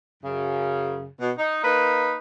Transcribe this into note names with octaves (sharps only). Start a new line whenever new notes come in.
F#2 C#3
B2
D#4
A#3 D#4 B4